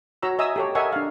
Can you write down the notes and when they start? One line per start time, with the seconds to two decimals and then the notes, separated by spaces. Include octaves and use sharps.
0.23 F#4 C#5 A#5 E6
0.39 D#5 E5 G#5 A#5 D#6 E6
0.56 G4 A4 C#5
0.75 A#4 D#5 E5 F#5 G#5 C#6
0.93 D4 F5